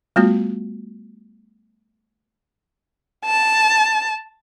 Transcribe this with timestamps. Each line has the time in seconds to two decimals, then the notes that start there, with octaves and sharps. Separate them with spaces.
0.16 G3 A3 B3 F4 F#4
3.25 A5